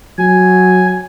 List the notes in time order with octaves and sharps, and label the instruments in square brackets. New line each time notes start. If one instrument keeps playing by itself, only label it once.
[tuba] F#3 [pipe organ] G#5